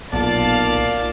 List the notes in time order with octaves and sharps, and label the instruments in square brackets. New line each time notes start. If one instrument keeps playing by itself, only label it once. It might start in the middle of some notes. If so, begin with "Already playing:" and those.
[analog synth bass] B1 [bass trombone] A#2 [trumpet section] D5 F5 [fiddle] A5